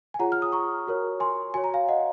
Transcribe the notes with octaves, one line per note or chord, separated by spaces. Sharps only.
G#5
F4 G#4 C#5 F#5 A#5
F6
D#6
A#5 C#6
F#4 A#4 C#5
G#5 C6
F#4 C#5 G#5
A#5
F5 G#5
D#5 F#5